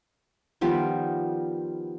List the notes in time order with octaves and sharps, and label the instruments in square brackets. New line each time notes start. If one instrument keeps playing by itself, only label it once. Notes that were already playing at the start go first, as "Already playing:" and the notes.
[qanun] D#3 F3 G3 B3